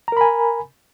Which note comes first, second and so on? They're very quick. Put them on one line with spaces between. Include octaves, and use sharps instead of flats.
A#5 A#4 B5 G#5